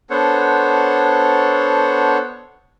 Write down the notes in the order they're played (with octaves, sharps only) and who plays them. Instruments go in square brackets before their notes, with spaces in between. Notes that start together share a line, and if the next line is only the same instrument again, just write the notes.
[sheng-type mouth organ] B3 D4 A4 C5 C#5 F#5